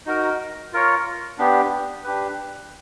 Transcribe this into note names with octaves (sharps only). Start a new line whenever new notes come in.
D#4 F#4 A#4
F4 A#4 C#5
B3 D4 G4
D4 G4 B4